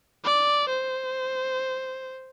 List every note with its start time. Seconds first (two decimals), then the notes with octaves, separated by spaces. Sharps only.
0.24 D5
0.69 C5